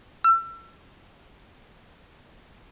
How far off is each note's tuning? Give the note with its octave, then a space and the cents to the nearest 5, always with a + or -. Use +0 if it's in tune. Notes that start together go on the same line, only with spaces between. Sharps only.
E6 +35